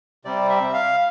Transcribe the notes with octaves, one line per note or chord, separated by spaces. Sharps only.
C3 G3 C4 D5
E5
F5